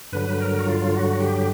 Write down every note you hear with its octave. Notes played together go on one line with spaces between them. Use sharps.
G2 D3 F#3 B4
A#4
F#4
F4
F#4
G4